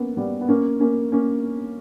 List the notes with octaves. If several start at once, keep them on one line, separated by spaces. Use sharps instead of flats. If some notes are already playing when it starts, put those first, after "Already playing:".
Already playing: A#3 B3 C#4
G3 B3
B3
A#3 C#4
A#3 C#4
A#3 C#4